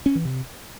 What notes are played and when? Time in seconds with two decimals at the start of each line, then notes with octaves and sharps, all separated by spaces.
0.06 C#4
0.15 E3
0.25 C3